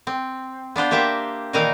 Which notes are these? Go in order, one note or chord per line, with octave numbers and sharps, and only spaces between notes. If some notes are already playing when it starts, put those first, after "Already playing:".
C4
B3 D4 F4 C5
A#3 G4 C5 E5
A#2 D#3 E3 D#4 A#4 F5